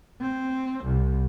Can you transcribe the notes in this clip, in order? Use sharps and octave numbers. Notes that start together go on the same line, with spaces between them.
C4
C2